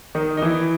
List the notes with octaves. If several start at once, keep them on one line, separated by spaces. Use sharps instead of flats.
D#3 D#4
D#4
E3 E4